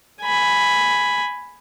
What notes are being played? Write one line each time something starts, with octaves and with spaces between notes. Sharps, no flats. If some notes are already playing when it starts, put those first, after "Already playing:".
G#5 B5